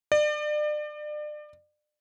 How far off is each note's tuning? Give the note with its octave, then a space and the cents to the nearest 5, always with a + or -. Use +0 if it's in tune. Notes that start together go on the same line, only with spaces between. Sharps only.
D5 +35